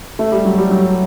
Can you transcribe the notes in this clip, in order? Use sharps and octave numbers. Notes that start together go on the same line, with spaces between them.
A3
G3
F#3
G3
F#3